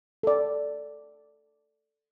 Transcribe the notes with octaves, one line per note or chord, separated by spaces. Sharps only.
A4 D5